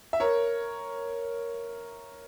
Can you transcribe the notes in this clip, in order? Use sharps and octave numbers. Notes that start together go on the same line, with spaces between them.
E5
A#4 C#5